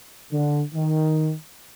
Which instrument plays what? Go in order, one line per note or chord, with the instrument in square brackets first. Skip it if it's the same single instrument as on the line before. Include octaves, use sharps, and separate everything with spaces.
[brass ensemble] D3
D#3